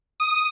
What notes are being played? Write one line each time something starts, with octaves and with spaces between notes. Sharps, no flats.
D#6